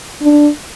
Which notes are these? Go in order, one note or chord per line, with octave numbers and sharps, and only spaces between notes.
D4